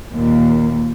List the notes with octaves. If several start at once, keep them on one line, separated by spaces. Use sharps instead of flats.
D#2 A#2